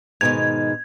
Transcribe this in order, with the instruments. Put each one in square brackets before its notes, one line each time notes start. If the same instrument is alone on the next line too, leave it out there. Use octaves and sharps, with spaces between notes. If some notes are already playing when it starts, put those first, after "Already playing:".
[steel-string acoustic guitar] G#2 B2 D#3 [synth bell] G#6